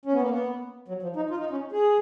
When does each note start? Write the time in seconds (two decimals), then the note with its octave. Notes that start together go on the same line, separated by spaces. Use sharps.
0.05 C#4
0.13 B3
0.21 A#3
0.30 B3
0.88 F#3
1.03 F3
1.16 D#4
1.30 F4
1.40 D#4
1.51 C#4
1.72 G#4